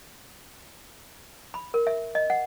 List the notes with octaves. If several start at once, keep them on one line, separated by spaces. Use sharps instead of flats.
B5
A#4
E5
D#5
F#5